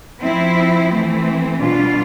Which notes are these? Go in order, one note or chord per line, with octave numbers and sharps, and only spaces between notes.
F3 C4 E4
E3 A3 C4
B2 G3 D4 F4